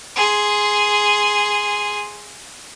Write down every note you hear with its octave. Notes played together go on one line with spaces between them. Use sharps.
G#4 C6